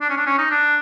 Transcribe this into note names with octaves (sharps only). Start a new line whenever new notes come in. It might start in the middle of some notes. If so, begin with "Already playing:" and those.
D4
C#4
D4
C#4
D#4
D4